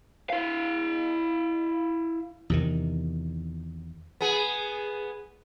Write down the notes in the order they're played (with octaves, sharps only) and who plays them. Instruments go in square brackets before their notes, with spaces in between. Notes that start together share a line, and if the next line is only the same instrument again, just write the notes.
[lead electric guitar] E4 F5
[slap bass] E2 C3 D#3
[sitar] B3 G#4